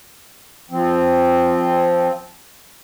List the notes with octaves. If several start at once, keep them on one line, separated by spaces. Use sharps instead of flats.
F3 C4